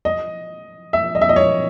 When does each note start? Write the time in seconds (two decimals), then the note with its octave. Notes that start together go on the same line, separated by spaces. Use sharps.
0.05 D#5
0.93 E5
1.15 D#5
1.21 E5
1.29 D#5
1.36 C#5